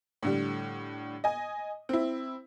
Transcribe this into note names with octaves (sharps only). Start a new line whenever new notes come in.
A2 D3 G3
D#5 G#5
C4 E4